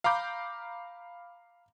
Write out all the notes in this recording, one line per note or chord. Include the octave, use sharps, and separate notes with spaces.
F5 A#5 B5 D6 G6